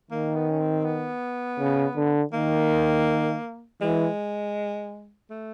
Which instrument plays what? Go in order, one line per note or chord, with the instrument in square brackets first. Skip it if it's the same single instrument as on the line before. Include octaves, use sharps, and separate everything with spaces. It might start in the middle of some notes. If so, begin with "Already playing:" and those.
[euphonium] D#3 [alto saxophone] A#3
[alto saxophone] B3
C#4
C4
B3
[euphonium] C#3
D3
[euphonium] D#3 [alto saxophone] A#3
[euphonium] E3 [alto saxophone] G#3
[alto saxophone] A3